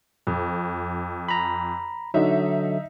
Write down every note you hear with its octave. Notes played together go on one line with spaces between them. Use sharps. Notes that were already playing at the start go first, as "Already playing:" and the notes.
F2
A#5 B5
D3 F#3 D#4 E5